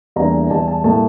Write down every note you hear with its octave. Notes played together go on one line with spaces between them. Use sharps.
E2 E3 G3 A#3 D4 A#5
E2 E3 G3 A5
A5
A2 G3 A#3 A5